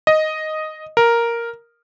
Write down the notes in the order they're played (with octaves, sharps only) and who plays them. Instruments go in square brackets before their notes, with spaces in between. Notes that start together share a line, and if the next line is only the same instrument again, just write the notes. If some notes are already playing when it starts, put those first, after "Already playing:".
[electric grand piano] D#5
A#4